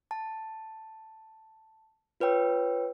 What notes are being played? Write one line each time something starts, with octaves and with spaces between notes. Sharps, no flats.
A5
F4 B4 C#5 G5 E6